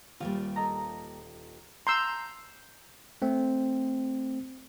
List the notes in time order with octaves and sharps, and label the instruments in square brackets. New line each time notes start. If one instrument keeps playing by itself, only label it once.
[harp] D#1 [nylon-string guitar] G3 A#3 F4
[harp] A4 D#5 A#5
[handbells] A#5 G6 [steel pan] C6 E6
[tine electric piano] A3 C4